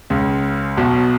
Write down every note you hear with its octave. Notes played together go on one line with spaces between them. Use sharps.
C#2 C#3
B1 B2